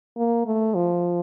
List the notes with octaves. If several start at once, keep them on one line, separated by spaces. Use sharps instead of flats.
A#3
A3
F3